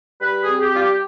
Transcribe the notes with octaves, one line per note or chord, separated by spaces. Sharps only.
G3 B4
G#4
C4
G#4
G4
G3 F4
G4